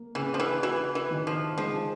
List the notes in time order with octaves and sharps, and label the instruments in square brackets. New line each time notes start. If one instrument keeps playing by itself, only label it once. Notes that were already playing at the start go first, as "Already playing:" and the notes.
Already playing: [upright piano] A#3
[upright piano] C#3 [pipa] E3
[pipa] F3
E3
[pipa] E3 [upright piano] F#4
[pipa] E3
[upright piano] D#3
[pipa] F3
[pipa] F3 [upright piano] G#3